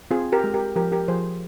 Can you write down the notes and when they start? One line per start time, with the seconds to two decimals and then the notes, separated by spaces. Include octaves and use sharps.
0.11 C4 F4 G#4
0.32 G4 A#4
0.44 G#3
0.54 G4 A#4
0.76 F3 G4 A#4
0.92 G4 A#4
1.08 F3 G#4 C5